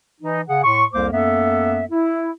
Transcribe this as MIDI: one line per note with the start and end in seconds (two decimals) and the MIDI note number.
0.21 0.41 52
0.21 0.41 63
0.48 0.61 49
0.48 0.61 68
0.48 0.61 78
0.64 0.84 45
0.64 0.84 84
0.64 0.84 85
0.93 1.07 36
0.93 1.07 41
0.93 1.07 58
0.93 1.07 72
0.93 1.07 86
1.12 1.85 42
1.12 1.85 58
1.12 1.85 59
1.12 1.85 69
1.12 1.85 76
1.91 2.30 64